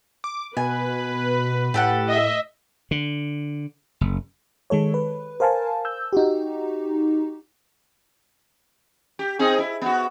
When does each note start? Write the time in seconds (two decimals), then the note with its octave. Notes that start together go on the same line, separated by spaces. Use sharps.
0.24 D6
0.57 B2 B4 G#5
1.74 A2 G4 A4 F#5
2.08 D#5 E5
2.91 D3
4.01 F#1
4.70 D#3 G#3 A4 C#5
4.94 B4
5.40 A#4 C5 F5 G#5 A5
5.85 E6 G6
6.13 D#4 F#4 G4
9.19 G4
9.39 C4 D#4 G#4
9.59 E4
9.82 B3 F#4